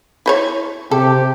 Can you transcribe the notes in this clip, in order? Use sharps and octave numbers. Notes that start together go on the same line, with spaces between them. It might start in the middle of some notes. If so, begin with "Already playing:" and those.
E4 C5 C#5
C3 G4 A4